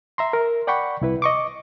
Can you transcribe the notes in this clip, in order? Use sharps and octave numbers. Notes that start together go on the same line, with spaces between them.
E5 A#5 C6
A#4
D5 F#5 G5 B5 C#6
C2 E4 B4
D#5 C#6 D6